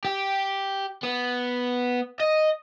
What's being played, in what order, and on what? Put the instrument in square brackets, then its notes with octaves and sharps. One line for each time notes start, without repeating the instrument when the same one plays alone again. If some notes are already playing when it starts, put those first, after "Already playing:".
[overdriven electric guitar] G4
B3
D#5